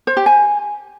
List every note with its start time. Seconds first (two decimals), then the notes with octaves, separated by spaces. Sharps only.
0.07 C5
0.17 G4
0.26 G#5